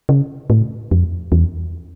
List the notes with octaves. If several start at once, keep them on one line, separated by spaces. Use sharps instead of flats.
C#3
A2
F2
E2